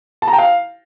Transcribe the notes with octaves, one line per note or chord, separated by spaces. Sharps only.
A5
A#5
G5
F5